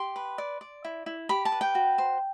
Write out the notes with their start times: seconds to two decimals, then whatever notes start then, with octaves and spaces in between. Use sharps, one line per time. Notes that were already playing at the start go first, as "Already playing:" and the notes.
Already playing: G4 C6
0.16 B4
0.38 D5
0.61 D5
0.84 E4
1.06 E4
1.29 G4 B5
1.45 A5
1.52 B4
1.61 G5
1.75 F#4
1.98 C5